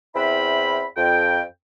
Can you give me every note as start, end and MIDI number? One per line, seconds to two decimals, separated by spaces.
0.15 0.85 40
0.15 0.85 60
0.15 0.85 64
0.15 0.85 76
0.15 0.85 83
0.97 1.41 41
0.97 1.41 79